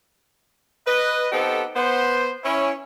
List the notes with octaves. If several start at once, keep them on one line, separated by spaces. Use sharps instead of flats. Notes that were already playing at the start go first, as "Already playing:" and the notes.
B4 D#5
B3 C4 D#4 G4 A4
B3 C5
C#4 E4